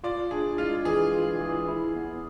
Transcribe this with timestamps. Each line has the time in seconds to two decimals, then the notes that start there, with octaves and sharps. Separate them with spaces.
0.04 F4 D5
0.31 D4 G#4
0.58 G#3 F4
0.85 E3 G#4
1.13 F4
1.41 E3
1.68 E4
1.95 B3